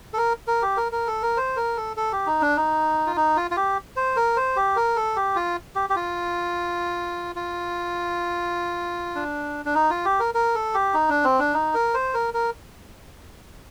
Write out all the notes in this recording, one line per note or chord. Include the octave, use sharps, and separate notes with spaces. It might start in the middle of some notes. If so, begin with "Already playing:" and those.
A4
A#4
A#4
G4
A#4
A#4
A4
A#4
C5
A#4
A4
A4
G4
D#4
D4
D#4
F4
D#4
F4
F4
G4
C5
A#4
C5
G4
A#4
A4
G4
F4
G4
G4
F4
F4
D4
D4
D#4
F4
G4
A#4
A#4
A4
G4
D#4
D4
C4
D4
D#4
A#4
C5
A#4
A#4